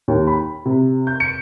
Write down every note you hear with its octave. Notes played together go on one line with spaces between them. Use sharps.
D#2
B5
C3
G6
C#7